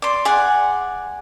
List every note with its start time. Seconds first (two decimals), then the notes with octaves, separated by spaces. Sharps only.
0.02 D5 C6
0.25 G#4 D5 F#5